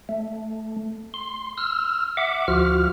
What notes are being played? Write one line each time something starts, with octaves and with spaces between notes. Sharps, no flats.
A3
C6
E6 F6
E5 F#5 D6
D2 F3 F4 F#4 F6